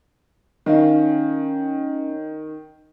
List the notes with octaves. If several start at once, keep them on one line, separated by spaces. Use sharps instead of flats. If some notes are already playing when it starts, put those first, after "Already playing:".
D#3 C#4 D#5 F5